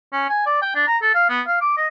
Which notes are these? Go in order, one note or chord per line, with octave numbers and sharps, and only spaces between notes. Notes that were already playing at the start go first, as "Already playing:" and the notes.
C#4
G#5
D5
G5
D4
A#5
A4
F5
B3
F5
D6
D#5